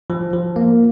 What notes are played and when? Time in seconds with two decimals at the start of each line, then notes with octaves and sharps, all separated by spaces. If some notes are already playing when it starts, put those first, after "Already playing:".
0.10 F3
0.33 F3
0.56 A#3